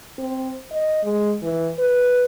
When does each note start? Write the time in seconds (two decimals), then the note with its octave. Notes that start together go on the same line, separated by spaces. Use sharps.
0.19 C4
0.71 D#5
1.04 G#3
1.42 E3
1.79 B4